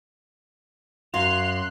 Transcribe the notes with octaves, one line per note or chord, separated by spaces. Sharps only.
F#2 F#4 F5 C6 F#6 F7